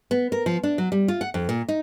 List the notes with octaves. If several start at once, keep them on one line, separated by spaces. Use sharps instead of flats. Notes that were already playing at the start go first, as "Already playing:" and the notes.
B3
A#4
F3
D4
F#3
G3
F4
F#5
F2
A#2
D#4